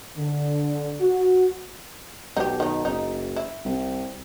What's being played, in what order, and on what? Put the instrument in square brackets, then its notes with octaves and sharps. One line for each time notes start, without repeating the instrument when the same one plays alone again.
[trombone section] D3
F#4
[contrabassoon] B1 [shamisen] D#4 G4
[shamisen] D#3 D#4
[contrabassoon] F#1 [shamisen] D#4
[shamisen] E4
[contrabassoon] C2